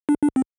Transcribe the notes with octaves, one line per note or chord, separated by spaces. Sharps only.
D4
D4
C4